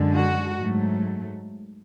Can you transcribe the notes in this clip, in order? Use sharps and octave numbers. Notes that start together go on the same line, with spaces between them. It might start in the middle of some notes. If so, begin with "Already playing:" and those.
Already playing: F#2 D3 G#3
F#4
G#2 F#3 A3